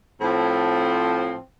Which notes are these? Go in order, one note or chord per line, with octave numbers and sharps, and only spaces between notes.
A2 F3 C4